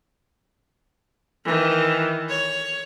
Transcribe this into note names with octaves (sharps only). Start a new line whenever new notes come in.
D#3 E3
C#5